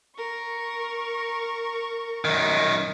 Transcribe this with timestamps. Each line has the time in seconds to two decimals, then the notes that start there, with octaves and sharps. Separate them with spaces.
0.17 A#4 C#6
2.25 F#2 D#3